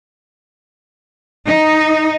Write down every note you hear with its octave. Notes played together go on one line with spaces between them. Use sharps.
D#4